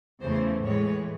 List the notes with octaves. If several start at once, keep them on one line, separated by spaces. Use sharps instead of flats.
E2 C#3 E3 A3 C5
A2 E3 G#3 C#5